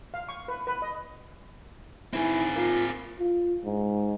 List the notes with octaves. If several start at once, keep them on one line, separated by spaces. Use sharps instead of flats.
F5
C#6
B4
B4
D#5
E3 C4 D#4 E4 G#4
A#3 F4 F5 C7
F4
G#2